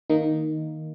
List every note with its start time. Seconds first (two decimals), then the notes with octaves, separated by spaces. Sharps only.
0.09 D#3 A#3 D#4